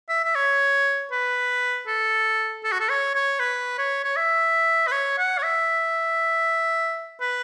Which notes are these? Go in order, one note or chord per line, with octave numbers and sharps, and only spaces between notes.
E5
E5
C#5
B4
A4
A4
F#4
A4
C#5
C#5
B4
C#5
C#5
E5
B4
C#5
F#5
C#5
E5
B4